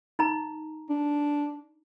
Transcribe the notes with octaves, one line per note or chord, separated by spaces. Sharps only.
D#4 A#5
D4